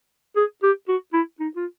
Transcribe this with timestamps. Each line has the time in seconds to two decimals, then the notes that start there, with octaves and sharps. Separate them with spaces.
0.37 G#4
0.63 G4
0.89 F#4
1.14 E4
1.40 D#4
1.56 F4